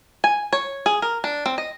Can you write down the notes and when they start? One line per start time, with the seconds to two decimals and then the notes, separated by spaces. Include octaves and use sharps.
0.24 G#5
0.53 C#5
0.86 G#4
1.02 A#4
1.24 D4
1.46 C4
1.58 D#5